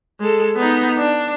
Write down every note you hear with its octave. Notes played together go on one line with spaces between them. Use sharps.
G#3 A4
B3 D#4
D4